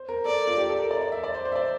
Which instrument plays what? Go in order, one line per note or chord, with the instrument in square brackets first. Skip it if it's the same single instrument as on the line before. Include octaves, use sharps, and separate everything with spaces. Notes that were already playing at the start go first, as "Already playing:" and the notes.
Already playing: [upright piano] C5
A#4
[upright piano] A4 [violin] D5
[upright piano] F4
G4
A4
A#4
D5
D5
E5
D5
C5
C5
E5
D5